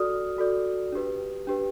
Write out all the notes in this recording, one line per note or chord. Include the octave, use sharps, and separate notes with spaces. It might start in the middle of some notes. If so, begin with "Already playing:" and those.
Already playing: F#4 A4 D5 D#6 F6
F#4 A4 D5
D4 G4 B4
D4 G4 B4